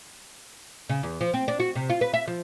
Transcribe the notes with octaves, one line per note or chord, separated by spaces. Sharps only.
C#3
E2
F3
C4
D4
F#4
C3
F4
B4
E5
F3